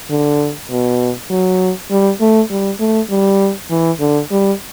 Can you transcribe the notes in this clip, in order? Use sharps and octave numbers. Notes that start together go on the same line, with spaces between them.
D3
B2
F#3
G3
A3
G3
A3
G3
E3
D3
G3